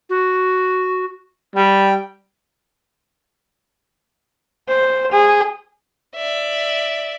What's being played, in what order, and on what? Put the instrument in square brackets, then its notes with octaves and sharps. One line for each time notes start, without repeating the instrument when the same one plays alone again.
[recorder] F#4
[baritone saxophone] G3 [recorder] G5
[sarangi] C5
G#4
[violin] D5 E5